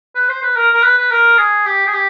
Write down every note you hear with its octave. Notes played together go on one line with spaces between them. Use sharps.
B4
C5
B4
A#4
A#4
B4
B4
A#4
G#4
G4
G#4
G4